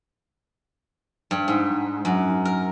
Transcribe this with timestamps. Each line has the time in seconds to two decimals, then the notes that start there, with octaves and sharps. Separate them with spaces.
1.31 G2
1.48 G#2
2.05 F#2
2.45 A#4